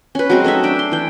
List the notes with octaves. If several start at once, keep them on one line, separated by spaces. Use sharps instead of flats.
C#4 B4
F#3 G#3 C4 F#4
A3 C#4 D#4 E5
D4 G5
C6
E3 G5